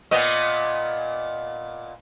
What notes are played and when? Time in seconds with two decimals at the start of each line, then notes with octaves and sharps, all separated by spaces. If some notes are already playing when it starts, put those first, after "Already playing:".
0.11 A#2 B3 D#5